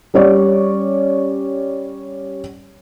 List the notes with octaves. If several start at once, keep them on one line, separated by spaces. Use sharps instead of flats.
G3 C#4 C#5 D5